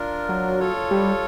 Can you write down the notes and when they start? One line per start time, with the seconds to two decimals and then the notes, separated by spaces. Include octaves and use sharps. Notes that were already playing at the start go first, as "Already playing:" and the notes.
Already playing: D4 F4 A#4
0.29 F#3
0.60 F4 A4 C#5
0.91 G3